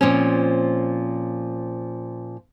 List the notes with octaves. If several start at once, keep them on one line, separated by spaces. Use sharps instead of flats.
A#2 F3 C4 C#4